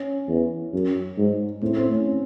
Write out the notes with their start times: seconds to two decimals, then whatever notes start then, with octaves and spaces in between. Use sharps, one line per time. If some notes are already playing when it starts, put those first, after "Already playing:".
Already playing: C#4
0.28 E2
0.73 F#2
1.18 G#2
1.62 A2 C4
1.77 C4
1.91 C#4